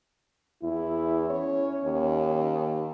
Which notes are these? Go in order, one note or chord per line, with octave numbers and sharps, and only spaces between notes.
E2 E4
C#4 C#5
D#2